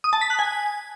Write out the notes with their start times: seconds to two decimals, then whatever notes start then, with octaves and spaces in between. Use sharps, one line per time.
0.04 D#6
0.13 A5
0.21 B6
0.30 F#6
0.39 G#5